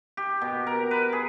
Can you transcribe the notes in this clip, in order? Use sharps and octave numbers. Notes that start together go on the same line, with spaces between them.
G4
B2
A#4
B4
G#4